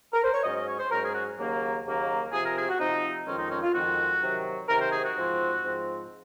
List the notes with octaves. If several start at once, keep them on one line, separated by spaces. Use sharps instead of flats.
A#4
C5
C#5
G#2 F#3 C#4 D#5
D#5
C#5
C5
G#2 F#3 C#4 A#4
G#4
F#4
D#2 C#3 F#3 A#3
D#2 C#3 F#3 A#3
C3 F3 C4 G#4
A#4
G#4
F#4
C3 F3 C4 D#4
F2 D#3 G#3 C4 C#4
D#4
C#4
F4
F2 D#3 G#3 C4 F#4
C3 D#3 F#3
C3 D#3 F#3 A#4
C5
G#4
F#4
G#2 F3 C4
G#2 F3 C4